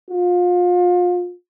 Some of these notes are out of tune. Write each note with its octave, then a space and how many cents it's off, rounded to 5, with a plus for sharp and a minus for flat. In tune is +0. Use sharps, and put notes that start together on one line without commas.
F4 +30